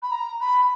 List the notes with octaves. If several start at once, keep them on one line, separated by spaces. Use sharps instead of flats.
B5
A#5
B5